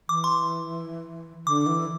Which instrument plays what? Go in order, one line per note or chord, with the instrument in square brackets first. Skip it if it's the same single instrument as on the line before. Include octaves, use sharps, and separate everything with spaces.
[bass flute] E3 [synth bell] D6
[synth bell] C6
[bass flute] D3 [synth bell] D6
[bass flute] E3